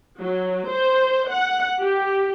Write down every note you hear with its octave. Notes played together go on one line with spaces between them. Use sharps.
F#3
C5
F#5
G4